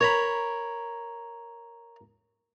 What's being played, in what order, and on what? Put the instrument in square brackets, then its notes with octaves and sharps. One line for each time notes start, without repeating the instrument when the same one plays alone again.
[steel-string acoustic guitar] A#4 [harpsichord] C#5 A#5 B5